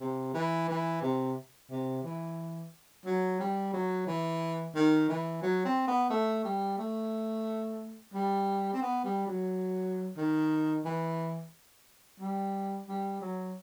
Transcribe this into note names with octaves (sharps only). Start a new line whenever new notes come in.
C3
E3
E3
C3
C3
E3
F#3
G3
F#3
E3
D#3
E3
F#3
C4
B3
A3
G3
A3
G3
C4
B3
G3
F#3
D#3
E3
G3
G3
F#3